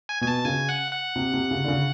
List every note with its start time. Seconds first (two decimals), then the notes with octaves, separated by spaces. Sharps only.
0.09 G#5
0.21 B2 G#5
0.27 A5
0.45 C#3 G#5
0.69 F#5
0.92 F#5
1.16 C3
1.33 C3
1.51 C#3
1.64 D3
1.68 C#3